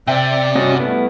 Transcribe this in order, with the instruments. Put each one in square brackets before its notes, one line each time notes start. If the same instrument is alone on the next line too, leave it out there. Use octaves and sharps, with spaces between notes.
[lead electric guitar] C3 [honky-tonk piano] C4 E5 G5 [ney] D5
[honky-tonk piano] G2 [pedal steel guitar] C#4 F#4 D#5
[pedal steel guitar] A3 B3 E4